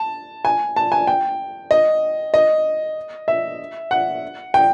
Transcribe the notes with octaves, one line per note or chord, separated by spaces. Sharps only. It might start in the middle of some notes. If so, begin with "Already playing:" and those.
Already playing: A5
G#5
A5
G#5
G5
D#5
D#5
E5
F#5
G5